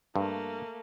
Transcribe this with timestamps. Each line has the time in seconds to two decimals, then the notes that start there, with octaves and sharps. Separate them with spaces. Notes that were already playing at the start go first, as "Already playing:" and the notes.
0.16 G2 A3 A#3